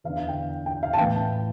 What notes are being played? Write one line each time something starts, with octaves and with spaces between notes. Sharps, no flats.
E2 F5
D3
F5
G5
G5
F5
A5
A2 E3 G5